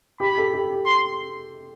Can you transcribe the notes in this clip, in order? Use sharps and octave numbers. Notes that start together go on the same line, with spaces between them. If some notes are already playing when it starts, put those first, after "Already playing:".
G4 B5
A4
G4
C6